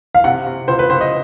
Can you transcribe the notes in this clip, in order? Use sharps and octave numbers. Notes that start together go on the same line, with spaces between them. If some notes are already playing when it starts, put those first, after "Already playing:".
F5
C3 F#5
C3
C#2 C5
B4
C#2 C5
D#5